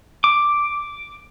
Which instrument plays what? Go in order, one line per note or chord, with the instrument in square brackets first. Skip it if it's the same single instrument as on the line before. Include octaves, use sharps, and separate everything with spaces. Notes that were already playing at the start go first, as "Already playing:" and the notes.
[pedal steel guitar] D6